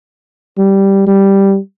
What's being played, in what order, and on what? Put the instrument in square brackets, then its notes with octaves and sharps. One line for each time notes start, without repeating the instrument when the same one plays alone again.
[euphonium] G3
G3